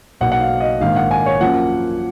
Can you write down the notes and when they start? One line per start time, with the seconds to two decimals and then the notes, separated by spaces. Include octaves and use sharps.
0.21 B1 B2 A#3 F#5
0.32 F#5
0.40 F5
0.60 D#5
0.81 A#1 G#2 D#3 A#3 F5
0.96 F#5
1.11 G#5
1.26 C#5
1.40 F#2 F3 A#3 F#5